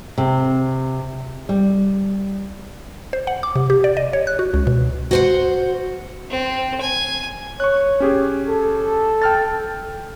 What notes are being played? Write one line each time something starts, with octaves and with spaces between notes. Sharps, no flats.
C3
G3
C5
F#5
D6
C3
G4
D5
D#5
C#5
F#6
F#4
C#2
B2
F#4 C5 F#5
C4
G#5
C#5 C#6 F#6
C#4 G4 G#4
A4
G5 F6 A6